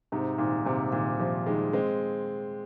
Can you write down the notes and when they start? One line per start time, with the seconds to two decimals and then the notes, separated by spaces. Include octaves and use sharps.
0.12 G#2 C3
0.38 A#2 D#3
0.65 G#2 C3
0.92 A#2 D#3
1.20 C3 F3
1.46 D#3 G#3
1.73 G#3 C4